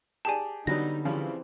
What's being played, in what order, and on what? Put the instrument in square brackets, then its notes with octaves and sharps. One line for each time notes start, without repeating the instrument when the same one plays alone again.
[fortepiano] G4 G#4 D5 [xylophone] G#5 A5
[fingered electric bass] D3 [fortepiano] F#3 G3 B3 [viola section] D#4 [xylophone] A#6
[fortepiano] C#3 F3 G3 [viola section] E3 C4